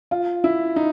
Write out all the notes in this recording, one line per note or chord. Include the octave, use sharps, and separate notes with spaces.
F4
E4
D#4